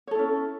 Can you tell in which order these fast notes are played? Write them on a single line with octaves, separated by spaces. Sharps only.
C#5 A4 E4 C#4